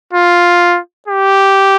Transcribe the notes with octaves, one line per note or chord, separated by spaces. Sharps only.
F4
G4